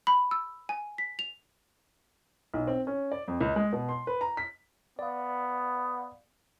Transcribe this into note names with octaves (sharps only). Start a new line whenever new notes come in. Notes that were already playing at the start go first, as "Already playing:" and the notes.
B5
E6
G#5
B6
F7
B1
C4
C#4
D5
F2
C#2
G#3
B2
C6
B4
A#5
B6
B3 D5 F5